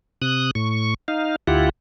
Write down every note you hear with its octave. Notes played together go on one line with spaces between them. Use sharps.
C3 D#6 F#6
A2 C#6
D#4 F5
D2 E4 F4 G4 F#5